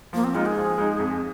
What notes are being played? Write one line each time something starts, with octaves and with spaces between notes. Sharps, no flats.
F3 A#3
C4
G#3 D#4 F4
G#4
F3
G#3 D#4
F2